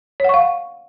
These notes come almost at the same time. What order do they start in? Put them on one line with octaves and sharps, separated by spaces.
C#5 F#5 C#6 F5